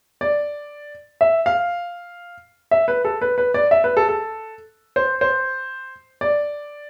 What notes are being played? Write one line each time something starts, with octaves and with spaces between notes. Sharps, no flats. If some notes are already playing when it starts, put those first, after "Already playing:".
D5
E5
F5
E5
B4
A4
B4
B4
D5
E5
B4
A4
A4
C5
C5
D5